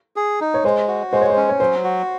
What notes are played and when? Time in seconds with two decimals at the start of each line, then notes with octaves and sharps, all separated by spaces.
0.16 G#4
0.41 D#4
0.54 C#5
0.64 G#3 C5
0.88 F#4
1.12 G#3 C5
1.21 C#5
1.30 C5
1.36 C#4
1.49 C#5
1.60 F#3 C5
1.84 F#4